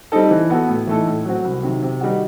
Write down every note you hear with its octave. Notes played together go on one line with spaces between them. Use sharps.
G3 C4 D#4 A4
E3
B3 F#4 A4
A2
E3 A3 D#4 A4
A2
F#3 C4 F#4
C2
C3 D#3 F#3
C3
D#3 G3 D#4 F#4